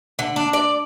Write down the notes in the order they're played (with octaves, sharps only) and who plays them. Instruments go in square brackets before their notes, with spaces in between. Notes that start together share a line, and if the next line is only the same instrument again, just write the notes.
[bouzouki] D3
D4
D5